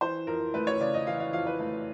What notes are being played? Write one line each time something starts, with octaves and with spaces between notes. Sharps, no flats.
E3 C5
F2 A#4
A3 B4
C#5
C#3 D5
D#5
E3 F5
F5
F2 F5
B4
A3